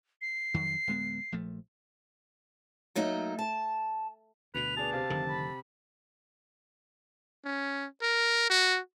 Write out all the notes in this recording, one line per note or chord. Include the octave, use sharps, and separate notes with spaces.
C7
F2 D#3 F#3
D1 G#3 B3
A#1 F3 A3
F#3 A3 A#3 D#4
A5
D2 B2 B4 F7
B3 D4 G#4 A5
C3 C4 F5
F1 D3 D#3
B5
C#4
A#4
F#4